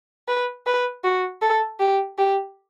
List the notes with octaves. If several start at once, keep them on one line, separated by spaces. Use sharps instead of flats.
B4
B4
F#4
A4
G4
G4